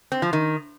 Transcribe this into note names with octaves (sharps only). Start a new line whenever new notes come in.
C4
F3
D#3